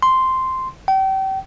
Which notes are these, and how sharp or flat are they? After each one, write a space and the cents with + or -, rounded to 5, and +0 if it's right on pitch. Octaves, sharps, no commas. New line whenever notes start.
C6 -5
G5 -35